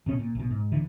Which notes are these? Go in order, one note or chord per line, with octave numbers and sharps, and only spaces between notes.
D1 B2 C#4
A#2
A#1 B2
G#2
D2 D3 E3